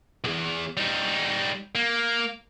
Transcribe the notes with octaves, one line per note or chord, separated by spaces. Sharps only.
B1 E2
G3 D#4
A#3